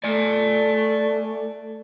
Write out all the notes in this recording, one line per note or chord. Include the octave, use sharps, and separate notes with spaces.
A3 D5 G#5